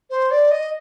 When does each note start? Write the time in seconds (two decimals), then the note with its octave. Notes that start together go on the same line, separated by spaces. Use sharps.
0.10 C5
0.31 D5
0.51 D#5